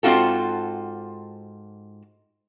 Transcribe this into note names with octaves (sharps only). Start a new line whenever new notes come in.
G#2 C4 F4 F#4 A4